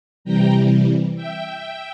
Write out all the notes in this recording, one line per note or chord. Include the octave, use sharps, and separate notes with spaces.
C3 E3 G3 G5 A#5
E5 G5